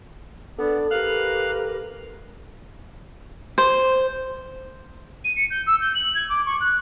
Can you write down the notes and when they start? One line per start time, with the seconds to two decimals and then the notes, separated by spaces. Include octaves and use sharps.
0.59 B3 D4 A4 D5 D6
0.91 G4 A#4 B4 F5 F6 F#6
3.58 C5
5.24 D#7
5.36 C#7
5.51 G6
5.67 E6
5.80 G6
5.95 F#7
6.15 G#6
6.29 D6
6.46 C#6
6.60 F#6